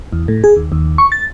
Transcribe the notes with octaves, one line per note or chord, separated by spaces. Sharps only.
E2
A2
G#4
D#2
D#2
C#6
A6